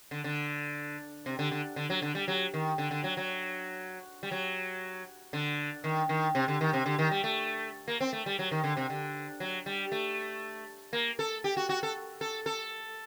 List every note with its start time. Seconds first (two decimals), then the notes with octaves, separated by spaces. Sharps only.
0.11 D3
0.24 D3
1.26 C3
1.39 D3
1.51 D3
1.76 D3
1.90 F#3
2.02 D3
2.15 G3
2.28 F#3
2.54 D#3
2.78 D3
2.91 D3
3.04 F#3
3.17 F#3
4.23 G3
4.31 F#3
5.33 D3
5.84 D#3
6.09 D#3
6.35 C3
6.48 D3
6.61 D#3
6.73 C3
6.86 D3
6.99 D#3
7.11 G3
7.24 A3
7.88 A#3
8.00 C4
8.13 A3
8.26 G3
8.39 F#3
8.51 D#3
8.64 D3
8.77 C3
8.90 D3
9.40 F#3
9.66 G3
9.92 A3
10.93 A#3
11.19 A4
11.44 G4
11.57 F#4
11.69 F#4
11.83 A4
12.21 A4
12.46 A4